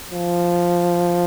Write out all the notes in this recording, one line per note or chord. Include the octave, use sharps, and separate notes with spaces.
F3